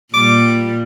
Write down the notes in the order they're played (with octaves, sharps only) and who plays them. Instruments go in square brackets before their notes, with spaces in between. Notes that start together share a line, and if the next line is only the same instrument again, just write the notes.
[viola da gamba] A#2 G3 [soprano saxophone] D6